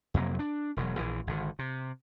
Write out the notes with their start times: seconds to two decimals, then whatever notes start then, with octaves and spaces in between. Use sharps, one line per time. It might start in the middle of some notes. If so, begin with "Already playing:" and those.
0.14 F2 C3 F#3 A#3
0.39 D4
0.77 E1 B2 F#3
0.99 A#1 E3
1.27 G#1 D3
1.59 C3